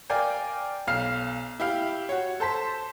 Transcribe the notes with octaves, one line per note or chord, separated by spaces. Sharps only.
A#4 D5 F5 G5 G#5
B1 F5 F6 C7
E4 G4 F5
F#4 C#5
A4 C5 A5 B6